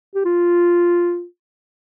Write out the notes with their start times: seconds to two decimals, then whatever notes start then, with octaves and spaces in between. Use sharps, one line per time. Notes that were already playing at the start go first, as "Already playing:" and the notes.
0.15 G4
0.25 F4